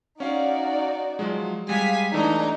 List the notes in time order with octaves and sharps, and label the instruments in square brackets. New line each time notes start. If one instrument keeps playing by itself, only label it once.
[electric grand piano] C#4 F5 [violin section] D#4 F#4 D5
[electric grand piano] F3 F#3 G#3
[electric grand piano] G3 G#3 [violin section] F5 G#5 B6
[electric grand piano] E3 A3 [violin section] D4 D#4 A#5